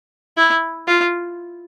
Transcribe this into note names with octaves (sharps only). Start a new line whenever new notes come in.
E4
F4